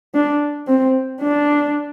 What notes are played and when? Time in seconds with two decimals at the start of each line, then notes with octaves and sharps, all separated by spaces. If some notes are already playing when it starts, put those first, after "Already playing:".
0.15 D4
0.68 C4
1.21 D4